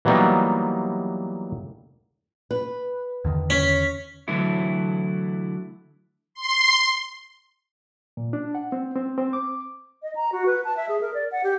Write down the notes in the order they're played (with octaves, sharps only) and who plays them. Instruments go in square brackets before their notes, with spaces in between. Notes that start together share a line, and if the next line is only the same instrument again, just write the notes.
[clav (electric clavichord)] E3 F#3 G3 A#3 B3 D#4
[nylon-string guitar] B4
[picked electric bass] E2 D3 D#3
[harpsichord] C#4 [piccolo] B6
[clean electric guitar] D3 E3 F#3 A3 E4
[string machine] C6
[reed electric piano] A#2
D4
F#5
C4
C4
C4
D6
[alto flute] D#5
A#5
F#4
B4
A5
E5
G#4
A#4
D5
F#5
G4